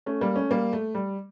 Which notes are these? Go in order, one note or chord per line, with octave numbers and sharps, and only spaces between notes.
A3 C#4
G3 A#3
A3 C#4
G3 A#3
A3
G3